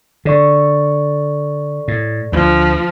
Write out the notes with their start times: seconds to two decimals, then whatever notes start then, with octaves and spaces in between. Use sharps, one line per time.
0.25 D3 A4 D5 C#6
1.88 A2
2.32 D2 F3